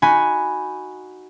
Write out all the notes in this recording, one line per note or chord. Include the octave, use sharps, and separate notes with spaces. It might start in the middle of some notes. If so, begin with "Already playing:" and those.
D#4 F#4 G#5 B5